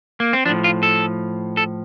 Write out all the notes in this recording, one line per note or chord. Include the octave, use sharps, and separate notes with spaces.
A#3
C4
A2 F3 D4
F4
A4
A4